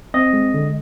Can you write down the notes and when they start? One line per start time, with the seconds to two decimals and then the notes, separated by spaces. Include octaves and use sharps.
0.14 C4 D#5
0.33 G#3
0.54 D3